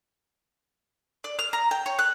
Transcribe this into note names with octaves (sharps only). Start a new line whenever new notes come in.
D5
F6
A#5
G5
C#5
F#6